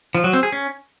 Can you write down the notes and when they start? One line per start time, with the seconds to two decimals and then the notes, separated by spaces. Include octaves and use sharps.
0.15 F3
0.24 F#3
0.33 C4
0.43 G#4
0.52 C#4